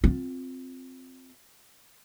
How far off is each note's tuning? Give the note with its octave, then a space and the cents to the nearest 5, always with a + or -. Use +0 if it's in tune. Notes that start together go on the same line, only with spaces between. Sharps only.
C4 +0 F4 +20